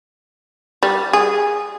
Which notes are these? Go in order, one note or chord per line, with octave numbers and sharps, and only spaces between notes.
G3
G#4